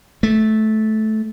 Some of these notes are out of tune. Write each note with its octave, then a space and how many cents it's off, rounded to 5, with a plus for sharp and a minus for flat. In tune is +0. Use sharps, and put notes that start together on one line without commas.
A3 -15